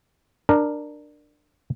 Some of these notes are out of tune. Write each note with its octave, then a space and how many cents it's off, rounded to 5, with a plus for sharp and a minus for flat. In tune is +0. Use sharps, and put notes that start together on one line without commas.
D4 +15 A#4 +0